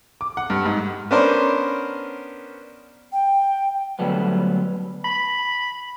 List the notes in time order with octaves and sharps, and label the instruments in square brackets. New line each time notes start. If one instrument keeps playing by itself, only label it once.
[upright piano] D6
F#5
G2
G#2
[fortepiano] B3 C#4 D4 A#4 C5
[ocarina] G5
[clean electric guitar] D3 F#3 G3 A3 B3
[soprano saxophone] B5